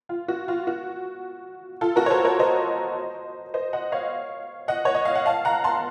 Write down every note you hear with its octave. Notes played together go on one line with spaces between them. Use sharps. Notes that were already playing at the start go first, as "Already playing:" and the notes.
F4
F#4
F4
F#4
F4 A4
F#4 A#4
C#5
A4 C5
A#4 C#5
C5 D#5
C5 D#5
D#5 F#5
C#5 F5
D#5 F#5
C#5
D#5
F5
F#5
F5 A5
F#5 A#5
A5 C6